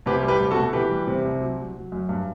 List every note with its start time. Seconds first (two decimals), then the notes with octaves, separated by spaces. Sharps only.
0.06 C2 G4 B4
0.23 G3
0.28 G4 B4
0.40 C2
0.51 F#4 A4
0.57 B2
0.73 E3 G4 B4
0.91 G3
1.07 C3
1.24 C2
1.40 F#3
1.57 F#3
1.75 F#3
1.92 F#2
2.09 G2